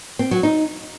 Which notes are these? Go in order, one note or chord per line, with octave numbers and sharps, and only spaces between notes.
C4
F#3
D#4